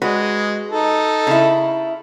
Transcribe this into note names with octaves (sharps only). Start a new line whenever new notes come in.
G#3 F#4 B4 C#5
D#4 A4
C#3 E4